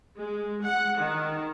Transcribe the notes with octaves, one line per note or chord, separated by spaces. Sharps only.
G#3
F#5
D#3